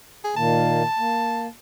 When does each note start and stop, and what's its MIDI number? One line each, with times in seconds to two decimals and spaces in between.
0.24 0.35 68
0.36 0.83 46
0.36 0.83 51
0.36 0.83 58
0.36 1.46 81
0.99 1.47 58